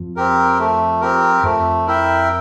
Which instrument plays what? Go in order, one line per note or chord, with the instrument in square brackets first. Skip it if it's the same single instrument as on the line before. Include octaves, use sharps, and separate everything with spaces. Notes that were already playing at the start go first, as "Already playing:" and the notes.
Already playing: [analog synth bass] F2
[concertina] C4 G4 A#4
A3
C4 G4 A#4
[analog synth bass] F2 [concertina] A3
[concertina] E4 A#4 E5 G5